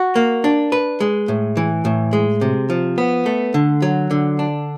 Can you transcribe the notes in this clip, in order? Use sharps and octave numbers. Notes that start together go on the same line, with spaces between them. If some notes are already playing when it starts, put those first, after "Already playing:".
Already playing: F#4
A#3
D4
B4
G#3
A2
E3
A2
G#3
C3
F3
B3
A3
D3
F#3
D3
D4